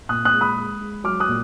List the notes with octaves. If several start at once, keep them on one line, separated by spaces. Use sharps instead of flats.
A#2 D#6 F#6
D#6 F#6
G#3
B5 D#6
G#3
G#3
F#3 D6 F6
D#6 F#6
A#2